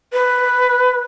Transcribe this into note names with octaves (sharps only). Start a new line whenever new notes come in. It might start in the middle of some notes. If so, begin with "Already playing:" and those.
B4